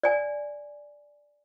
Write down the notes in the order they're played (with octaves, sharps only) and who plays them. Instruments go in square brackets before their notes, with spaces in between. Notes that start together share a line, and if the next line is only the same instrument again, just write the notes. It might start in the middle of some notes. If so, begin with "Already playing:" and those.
[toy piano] D5 G#5